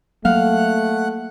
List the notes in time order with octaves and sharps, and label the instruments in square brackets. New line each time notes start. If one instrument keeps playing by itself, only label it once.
[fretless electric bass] F#3 A#3 [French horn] A3 [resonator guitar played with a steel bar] F5 [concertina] F#5 F#6